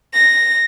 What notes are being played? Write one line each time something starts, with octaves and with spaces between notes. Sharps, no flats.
A#6